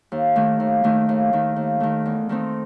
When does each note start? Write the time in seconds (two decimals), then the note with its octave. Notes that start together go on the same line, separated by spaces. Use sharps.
0.12 D#2
0.36 D#3 A3
0.60 D#2
0.84 D#3 A3
1.09 D#2
1.33 D#3 A3
1.56 D#2
1.80 D#3 A3
2.06 E2
2.29 D#3 A3 C4 D#4